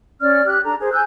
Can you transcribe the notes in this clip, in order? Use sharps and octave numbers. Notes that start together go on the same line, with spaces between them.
C#4 D5 F6
G4 F#6
D4 A4 A#5
G#4 A#4 C5
G#5 E6 F#6 G6